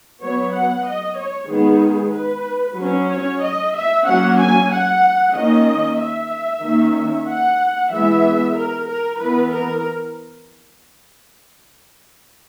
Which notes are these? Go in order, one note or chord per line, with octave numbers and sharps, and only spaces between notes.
F#3 B3 C#5
F#5
D#5
C#5
D#3 G#3 B3 G#4
B4
F#3 C#4
C#5
D#5
E5
F#3 A#3 C#4 F#5
G#5
F#5
D#3 A#3 C#4 D#5
E5
D#3 A#3 C#4
F#5
E3 G#3 B3 E5
A#4
A#4
E3 B3 B4
A#4